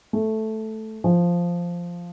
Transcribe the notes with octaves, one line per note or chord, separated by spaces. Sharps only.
A3
F3